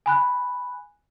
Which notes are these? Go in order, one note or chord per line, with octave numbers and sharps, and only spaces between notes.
G#5 B5 F#6